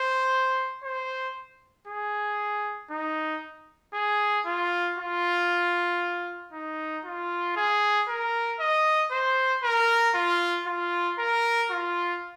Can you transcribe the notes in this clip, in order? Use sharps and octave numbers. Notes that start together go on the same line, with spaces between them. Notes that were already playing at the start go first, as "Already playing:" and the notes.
Already playing: C5
C5
G#4
D#4
G#4
F4
F4
D#4
F4
G#4
A#4
D#5
C5
A#4
F4
F4
A#4
F4